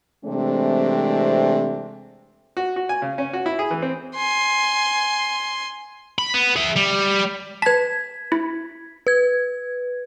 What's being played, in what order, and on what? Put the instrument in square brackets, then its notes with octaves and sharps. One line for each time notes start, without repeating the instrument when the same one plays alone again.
[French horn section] C3 E3 G#3 A3 C4 D4
[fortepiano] F#4
F#4
G#5
C#3
C#4
F#4
E4
G#4
E3
C4
[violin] G#5 C6
[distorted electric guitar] B5
B3
G#4 E5
G3
[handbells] B4 A5 [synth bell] G#6 B6
[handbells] E4
[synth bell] B4 G#6